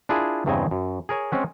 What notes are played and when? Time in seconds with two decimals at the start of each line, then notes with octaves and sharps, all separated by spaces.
0.09 D4 E4 F4 G#4 A#4
0.46 E2 G2 C#3 C4 D#5 G#5
0.71 F#2
1.09 G#4 A#4 C#5 G#5
1.32 G#3 C4 C#4 F#5